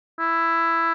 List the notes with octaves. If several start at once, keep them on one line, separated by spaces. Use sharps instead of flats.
E4